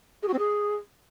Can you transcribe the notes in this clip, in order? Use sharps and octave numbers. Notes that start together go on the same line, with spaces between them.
G#4
F#4
C4
G#4